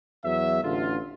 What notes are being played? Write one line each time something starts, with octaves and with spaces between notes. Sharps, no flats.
E2 F#3 E5
A1 D3 F4